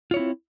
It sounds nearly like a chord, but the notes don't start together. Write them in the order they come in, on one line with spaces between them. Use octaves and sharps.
F4 C#5 E4 C4